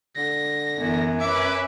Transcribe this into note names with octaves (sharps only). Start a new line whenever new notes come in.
D3 A#6
F#2 E3 B3
C#4 B4 E5 D6